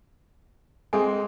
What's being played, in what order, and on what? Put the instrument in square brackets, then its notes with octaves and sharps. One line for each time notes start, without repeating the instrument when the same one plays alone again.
[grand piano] G#3 C4 [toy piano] G#4 A4 G#5